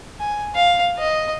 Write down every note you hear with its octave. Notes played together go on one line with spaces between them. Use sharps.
G#5
F5
D#5